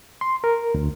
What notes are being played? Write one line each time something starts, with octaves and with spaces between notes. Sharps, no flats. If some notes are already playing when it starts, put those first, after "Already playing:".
C6
A#4
D2